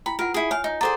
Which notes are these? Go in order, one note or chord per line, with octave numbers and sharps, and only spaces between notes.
E4 G5 B5
F4 A#4 F#5
E4 G#4
C#5 F5 G#5
D#4
G#4 A4 C5 D5 F#5 A#5